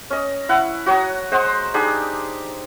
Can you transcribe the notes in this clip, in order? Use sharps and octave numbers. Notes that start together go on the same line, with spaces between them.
C#4 D#5
E4 F#5
F#4 C#5 A#5 D#6
G#3 C5 D#5 F#5
D4 D#4 G4 G#4